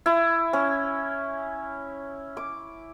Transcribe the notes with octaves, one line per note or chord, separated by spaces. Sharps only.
E4
C#4
D6